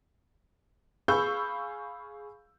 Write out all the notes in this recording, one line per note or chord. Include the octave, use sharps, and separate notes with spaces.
G#4 F5 B5 C#6 E6 G6